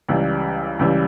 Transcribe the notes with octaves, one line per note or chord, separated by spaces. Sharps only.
C#2 C#3 E3 G3
C#2 C#3 E3 G3